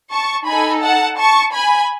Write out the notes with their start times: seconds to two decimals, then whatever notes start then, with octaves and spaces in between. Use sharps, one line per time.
0.10 A5 C#6
0.46 D#4 A4 G#5 B5
0.82 F#5 A5
1.17 A5 C#6
1.53 G#5 B5